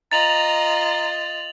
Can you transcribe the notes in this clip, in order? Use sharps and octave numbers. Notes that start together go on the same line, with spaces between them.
F4 D#5 A#5 A6 F7 F#7